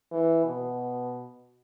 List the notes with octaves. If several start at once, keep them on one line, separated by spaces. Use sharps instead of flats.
E3
B2